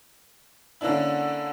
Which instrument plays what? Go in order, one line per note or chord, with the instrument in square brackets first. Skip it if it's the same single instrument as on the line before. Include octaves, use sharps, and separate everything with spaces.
[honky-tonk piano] D3 A#3 C#4 D4 E4